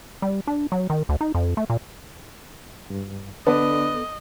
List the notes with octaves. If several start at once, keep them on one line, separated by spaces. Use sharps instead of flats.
G3
D4
F#3
D#3
D2
D#4
F2
A3
A#2
G2
D3 B3 A4 B4 D5 D#5